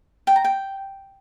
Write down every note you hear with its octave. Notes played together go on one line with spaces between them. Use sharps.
G5
A#5
G5